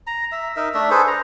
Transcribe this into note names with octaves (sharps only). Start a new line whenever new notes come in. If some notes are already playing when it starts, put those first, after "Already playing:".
A#5
E5
D#4 A#4 E5
A3 D4 E5
G#4 A4 B4 C5
A#5